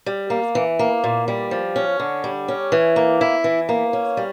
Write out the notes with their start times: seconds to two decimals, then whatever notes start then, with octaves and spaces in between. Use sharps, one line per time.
0.06 G3
0.30 A#3
0.55 E3
0.79 A#3
1.04 A#2
1.28 G3
1.51 F3
1.76 C#4
2.00 D3
2.24 G3
2.48 C#4
2.72 E3
2.96 A#3
3.21 E4
3.44 E3
3.69 A#3
3.93 C#4
4.17 G3